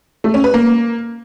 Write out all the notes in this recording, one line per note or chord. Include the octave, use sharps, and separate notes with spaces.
A3
C#4
B4
A#3